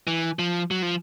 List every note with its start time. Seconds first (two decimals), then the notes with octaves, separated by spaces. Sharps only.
0.07 E3
0.39 F3
0.71 F#3
0.82 F3